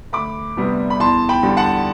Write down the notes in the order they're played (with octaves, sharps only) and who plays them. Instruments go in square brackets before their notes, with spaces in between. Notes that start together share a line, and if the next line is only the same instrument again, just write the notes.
[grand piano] D2 B5 D6
C3 G3 B3 D4
B5
E2 A5 C6
G5 B5
D3 G3
F#5 A5